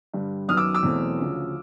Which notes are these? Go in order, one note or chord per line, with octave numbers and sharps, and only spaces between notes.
G2 D3 G3
F#2 D#3 F#3 B3 D#6 F6
D6 E6
D6 E6
E2 B2 F#3 A3 C4
D2 C#3 F3